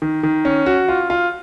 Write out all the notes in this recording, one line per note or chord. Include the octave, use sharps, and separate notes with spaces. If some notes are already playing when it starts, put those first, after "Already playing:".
D#3
D#3
C#4
F#4
F4
F4